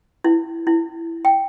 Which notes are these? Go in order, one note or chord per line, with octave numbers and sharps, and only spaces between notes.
E4
E4
G5